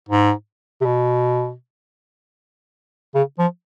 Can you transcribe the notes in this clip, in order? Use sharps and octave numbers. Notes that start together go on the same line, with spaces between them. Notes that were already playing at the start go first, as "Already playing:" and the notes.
G#2
C3
B2
C#3
F3